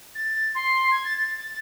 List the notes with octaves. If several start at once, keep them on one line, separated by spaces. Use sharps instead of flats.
A6
C6
G#6
A6
A6